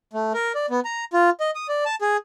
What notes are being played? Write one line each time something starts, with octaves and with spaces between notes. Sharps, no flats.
A3
A#4
D5
B3
A#5
F4
D#5
D#6
D5
A5
G#4